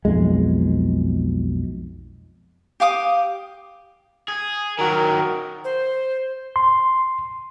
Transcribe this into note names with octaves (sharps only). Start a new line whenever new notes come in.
B1 F2 G#3
G4 F5 D6 D#6
G#4
D#3 F#3 F#4 A#4
C5
C6